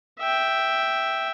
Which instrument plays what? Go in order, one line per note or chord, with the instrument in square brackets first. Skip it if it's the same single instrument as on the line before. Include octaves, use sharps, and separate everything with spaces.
[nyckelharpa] E5 G5